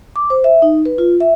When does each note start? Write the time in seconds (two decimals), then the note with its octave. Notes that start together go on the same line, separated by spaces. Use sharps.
0.16 D6
0.30 C5
0.44 E5
0.62 D#4
0.86 B4
0.98 F4
1.20 E5